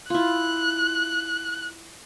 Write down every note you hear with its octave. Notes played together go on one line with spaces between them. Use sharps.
E4 F4 F#6